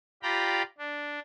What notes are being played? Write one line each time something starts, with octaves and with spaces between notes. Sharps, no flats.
F4 G4 D5 G5 A#5 B5
D4